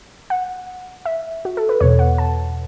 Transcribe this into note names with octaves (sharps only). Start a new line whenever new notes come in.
F#5
E5
F#4
A4
B4
E2 B2 C#5
F#5
A5